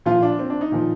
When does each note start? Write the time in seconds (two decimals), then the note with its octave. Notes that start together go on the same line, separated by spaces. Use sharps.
0.06 A#2 F3 F4
0.22 D4
0.39 C4
0.50 D4
0.61 D#4
0.72 A#2 F3